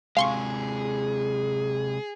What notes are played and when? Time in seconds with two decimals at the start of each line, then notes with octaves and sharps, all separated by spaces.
0.17 C3 G#3 G#4 F5 C6 C#6